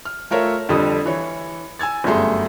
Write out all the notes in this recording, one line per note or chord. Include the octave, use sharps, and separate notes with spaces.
F6
A3 F4 A#4 C#5 E5
F2 D3 G3 D#6
E3 C#5
G#5 E6 G#6 A6
G1 F#2 G3 A3 G#4 C6